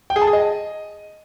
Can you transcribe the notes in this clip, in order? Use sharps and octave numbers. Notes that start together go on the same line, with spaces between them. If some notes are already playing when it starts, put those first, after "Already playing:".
G5
G#4
A5
G#4
D#5